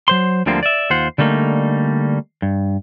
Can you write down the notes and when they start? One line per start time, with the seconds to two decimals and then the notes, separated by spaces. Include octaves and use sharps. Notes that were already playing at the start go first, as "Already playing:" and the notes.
0.08 F#3 C5 C6
0.46 D2 D3 F3 G3 A#3 C4
0.63 D5 E5
0.90 D#2 F4 C5 F#5
1.18 D3 G3 A3 A#3 D#4
2.42 G2